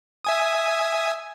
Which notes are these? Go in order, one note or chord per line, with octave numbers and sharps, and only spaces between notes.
E5 G#5 D#6